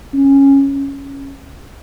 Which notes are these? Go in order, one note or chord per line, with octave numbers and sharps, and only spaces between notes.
C#4